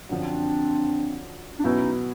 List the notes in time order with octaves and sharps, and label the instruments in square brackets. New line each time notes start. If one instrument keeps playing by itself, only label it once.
[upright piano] F#2 D3 F3 [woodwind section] C4 D4
[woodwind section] D4
[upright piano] B2 F#3 B3 E4 [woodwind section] C#4 D#4